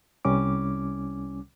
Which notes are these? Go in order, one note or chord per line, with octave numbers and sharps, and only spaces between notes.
C2 G3 C#4 D6